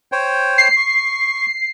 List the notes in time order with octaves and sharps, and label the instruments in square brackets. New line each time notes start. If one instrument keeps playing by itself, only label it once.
[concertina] C5 C#5 G5
[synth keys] C7
[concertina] C#6